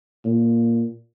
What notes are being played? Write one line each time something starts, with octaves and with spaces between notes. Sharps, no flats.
A#2